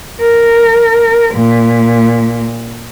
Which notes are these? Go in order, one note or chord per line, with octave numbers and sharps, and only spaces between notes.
A#4
A#2